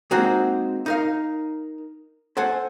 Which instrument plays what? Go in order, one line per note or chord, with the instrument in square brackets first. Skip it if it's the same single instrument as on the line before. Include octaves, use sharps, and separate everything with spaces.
[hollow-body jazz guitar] G#3 A#3 C4 D#4 F#4 G#4
D#4 A#4 F5
A4 C5 F#5 G#5